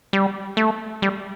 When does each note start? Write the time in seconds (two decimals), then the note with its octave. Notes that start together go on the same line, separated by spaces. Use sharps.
0.13 G3
0.57 A3
1.02 G3